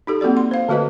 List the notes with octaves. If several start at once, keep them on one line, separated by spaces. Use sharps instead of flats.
D#4 G4 A4
A#3 C4 F#4 A4 D5
C6
C5 F5
D3 A3 F#4 B4 D#5